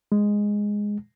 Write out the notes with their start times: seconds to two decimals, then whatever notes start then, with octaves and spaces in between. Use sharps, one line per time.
0.12 G#3